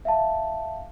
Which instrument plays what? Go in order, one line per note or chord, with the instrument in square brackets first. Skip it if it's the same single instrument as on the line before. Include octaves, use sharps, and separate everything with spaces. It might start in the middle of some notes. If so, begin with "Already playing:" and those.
[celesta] E5 F5 A5